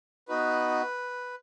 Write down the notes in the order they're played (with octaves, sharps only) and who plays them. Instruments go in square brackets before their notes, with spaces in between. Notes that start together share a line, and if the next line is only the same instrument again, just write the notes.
[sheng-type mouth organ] B3 D#4 F#4 B4